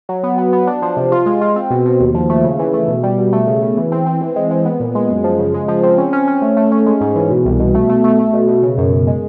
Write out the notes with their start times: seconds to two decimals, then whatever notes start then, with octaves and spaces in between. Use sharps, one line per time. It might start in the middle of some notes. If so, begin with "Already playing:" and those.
0.09 F#3
0.23 B3
0.38 B3
0.53 B3
0.67 D4
0.82 F3
0.97 C3
1.12 F4
1.26 G#3
1.41 F4
1.56 C4
1.70 B2
1.85 B2
2.00 D#2
2.14 F3
2.29 A3
2.44 C#3
2.59 E3
2.73 A3
2.88 B2
3.03 G3
3.18 B2
3.33 A3
3.47 C#3
3.62 C#3
3.77 E3
3.92 C4
4.06 C4
4.21 E3
4.36 G#3
4.51 G#3
4.65 B3
4.80 A#2
4.95 G#3
5.10 F#2
5.24 F3
5.39 C#3
5.54 G#3
5.68 F3
5.83 C4
5.98 C#4
6.13 C#4
6.27 C#4
6.42 A3
6.57 A3
6.71 C#4
6.86 G#3
7.01 G#2
7.15 E3
7.30 B2
7.45 C2
7.59 B2
7.74 A3
7.89 A3
8.04 A3
8.19 A3
8.33 B2
8.48 B2
8.63 C#3
8.78 F#2
8.92 F#2
9.07 G#3